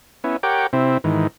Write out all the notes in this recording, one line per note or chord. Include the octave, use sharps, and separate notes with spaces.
B3 C#4 E4
G4 A#4 C#5 F#5 G5 D6
C3 C4 E4
G#2 D#3 E3